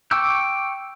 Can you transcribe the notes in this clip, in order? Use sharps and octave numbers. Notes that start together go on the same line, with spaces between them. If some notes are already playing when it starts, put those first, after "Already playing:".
G5 C#6 D6 E6 G6